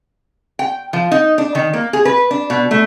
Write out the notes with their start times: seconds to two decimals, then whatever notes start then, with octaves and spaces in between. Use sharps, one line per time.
0.59 G5
0.93 F3
1.11 D#4
1.38 D4
1.55 D#3
1.73 A#3
1.93 G#4
2.05 B4
2.31 D4
2.50 B2
2.71 A3